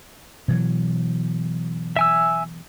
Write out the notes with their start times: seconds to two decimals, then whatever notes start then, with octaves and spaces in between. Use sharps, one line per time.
0.48 B2 E3 F#3
1.96 E5 G#5 E6